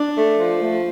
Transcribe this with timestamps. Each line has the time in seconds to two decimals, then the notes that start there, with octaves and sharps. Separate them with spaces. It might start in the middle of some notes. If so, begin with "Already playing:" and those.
Already playing: D4
0.15 A3
0.37 F3
0.60 A3